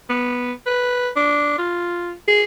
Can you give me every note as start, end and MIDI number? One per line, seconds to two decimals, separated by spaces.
0.09 0.53 59
0.66 1.09 71
1.16 1.53 62
1.58 2.12 65
2.28 2.43 68